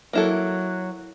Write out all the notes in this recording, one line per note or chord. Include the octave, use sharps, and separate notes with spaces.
F#3 A#3 E4 A4